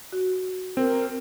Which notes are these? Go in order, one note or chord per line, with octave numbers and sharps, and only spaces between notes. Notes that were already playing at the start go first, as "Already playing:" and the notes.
F#4
C4 A#4